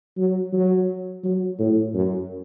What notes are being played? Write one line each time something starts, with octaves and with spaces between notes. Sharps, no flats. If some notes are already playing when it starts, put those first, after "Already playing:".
F#3
F#3
F#3
A2
F#2